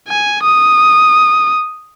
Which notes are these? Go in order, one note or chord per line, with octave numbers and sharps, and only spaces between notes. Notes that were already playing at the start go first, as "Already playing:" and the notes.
G#5
D#6